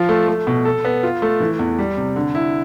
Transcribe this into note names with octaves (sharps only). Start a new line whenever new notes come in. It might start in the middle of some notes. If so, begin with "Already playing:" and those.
Already playing: F3 F4
A3
A3
B2
A4
B3
F4
A3
E3
E2
G3
C3
D3
E4